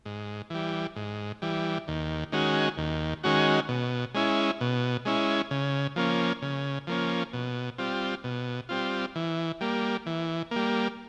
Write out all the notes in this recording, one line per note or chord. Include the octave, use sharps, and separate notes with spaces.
G#2
E3 G3
G#2
E3 G3
D#2
D#3 G#3 C#4 F#4
D#2
D#3 G#3 C#4 F#4
B2
G#3 C#4 E4
B2
G#3 C#4 E4
C#3
F3 A#3 C#4
C#3
F3 A#3 C#4
B2
G3 C4 F4
B2
G3 C4 F4
E3
G3 A#3
E3
G3 A#3